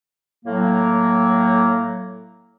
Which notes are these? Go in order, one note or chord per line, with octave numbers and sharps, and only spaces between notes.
A2 F#3 A#3